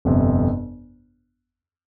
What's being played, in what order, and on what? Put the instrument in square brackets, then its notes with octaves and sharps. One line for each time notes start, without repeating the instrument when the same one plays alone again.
[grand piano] G1 F2 C3